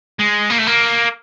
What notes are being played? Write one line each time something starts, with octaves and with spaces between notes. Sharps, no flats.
G#3
A#3
A3
A#3